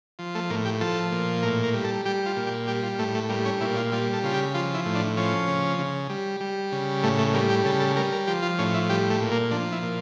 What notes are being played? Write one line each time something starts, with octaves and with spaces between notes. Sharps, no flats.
F3
A3
A2 A#3
G4
F3 A4
A#2
A2 A#4
A#4
G3
A4
G3 G4
F4
A#2
G4
G3 G4
F4
A2 A3
A3
G3 A#3
C#4
A#2 E4
F4
G3 F4
A4
C#3 F4
G4
F3 F4
E4
A2
D4
F3 C#4
C#3
C#3
G3
G3
C#3
A2 A3
A3
G3 A#3
G4
C#3 A4
A4
G3 A#4
A#4
F3 G4
F4
A2 C#4
E4
G3 G4
A3
A#2
A#3
F3 D4
E4
A#2